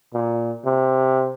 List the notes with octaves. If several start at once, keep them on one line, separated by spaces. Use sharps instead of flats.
A#2
C3